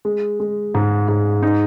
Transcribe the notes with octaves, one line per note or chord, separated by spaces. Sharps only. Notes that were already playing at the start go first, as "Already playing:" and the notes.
G#3
G#3
G#2
G#2
D#4